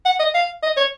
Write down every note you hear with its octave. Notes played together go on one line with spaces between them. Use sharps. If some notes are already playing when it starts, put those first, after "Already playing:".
F#5
D#5
F5
D#5
C#5